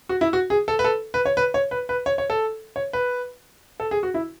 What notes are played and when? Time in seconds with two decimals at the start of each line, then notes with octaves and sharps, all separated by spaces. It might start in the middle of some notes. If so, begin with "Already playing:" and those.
0.09 F#4
0.21 E4
0.33 F#4
0.50 G#4
0.68 A4
0.79 B4
0.84 A4
1.14 B4
1.26 C#5
1.37 B4
1.54 C#5
1.71 B4
1.89 B4
2.06 C#5
2.18 C#5
2.30 A4
2.76 C#5
2.93 B4
3.80 A4
3.91 G#4
4.03 F#4
4.14 E4